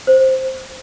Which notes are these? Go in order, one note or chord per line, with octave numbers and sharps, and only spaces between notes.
C5